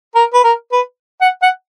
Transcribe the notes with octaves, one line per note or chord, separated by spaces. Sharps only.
A#4
B4
A#4
B4
F#5
F#5